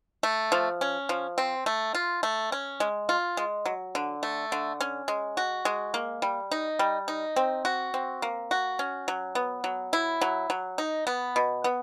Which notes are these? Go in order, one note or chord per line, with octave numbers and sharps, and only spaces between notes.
A3
F3
C#4
F3
C4
A3
F4
A3
C#4
G#3
F4
G#3
F#3
D3
A3
D3
C#4
G#3
F#4
G#3
A#3
G3
D#4
G3
D#4
C4
F#4
C4
A#3
F#4
C#4
F#3
B3
F#3
E4
F#3
F#3
D#4
B3
B2
B3